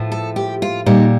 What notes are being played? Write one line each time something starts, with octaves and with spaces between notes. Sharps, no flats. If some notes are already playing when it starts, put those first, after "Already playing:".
Already playing: A2 F3
A4
G4
F4
A#2 G3 D#4